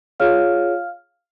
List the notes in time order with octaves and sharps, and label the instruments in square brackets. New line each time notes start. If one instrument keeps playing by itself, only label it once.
[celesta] F4 G#4 C#5 F5 F6